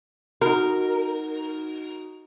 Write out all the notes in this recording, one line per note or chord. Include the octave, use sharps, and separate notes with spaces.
D#4 F#4 A#4